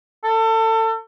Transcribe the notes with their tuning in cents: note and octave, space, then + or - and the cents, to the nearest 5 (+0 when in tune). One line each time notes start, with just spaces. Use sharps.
A4 +30